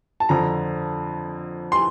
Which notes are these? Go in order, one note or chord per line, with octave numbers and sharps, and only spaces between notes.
A5
F2 D3 F3 A#5
C6